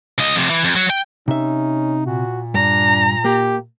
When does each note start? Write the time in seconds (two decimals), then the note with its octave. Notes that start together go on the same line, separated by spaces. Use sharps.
0.18 C#2 D#5
0.35 F2 C3
0.50 E3
0.64 F2
0.76 F#3
0.90 G5
1.28 C3 C#4 D#4 E5
2.06 A#2 F#4
2.54 G2 D4 A#5
3.25 A#3 G4